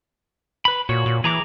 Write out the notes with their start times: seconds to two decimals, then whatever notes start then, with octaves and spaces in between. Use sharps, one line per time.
0.65 B4 B5
0.89 A#2 F#4 C#5
1.06 A#2
1.24 E3 G#4 A#5 D6